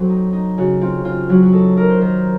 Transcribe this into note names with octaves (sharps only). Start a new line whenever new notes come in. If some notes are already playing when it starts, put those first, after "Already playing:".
Already playing: F#3 C4 F#4 A4
D#4
D#4
C#3 F#4
C4 F4
C#3 F4
F#3 F#4
F#4
D#4 A4
D#4 A#4
C5
D#3 A#4